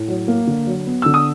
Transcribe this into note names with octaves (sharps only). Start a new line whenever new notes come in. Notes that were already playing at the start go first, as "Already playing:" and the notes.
Already playing: A2
F#3
A#3
D3
F#3
B3
D3 E6
D#6